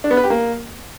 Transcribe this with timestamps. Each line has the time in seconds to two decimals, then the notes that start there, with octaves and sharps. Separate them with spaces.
0.04 D4
0.11 B3
0.17 B4
0.24 G4
0.30 A#3